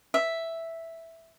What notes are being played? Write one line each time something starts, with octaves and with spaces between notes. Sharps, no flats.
E5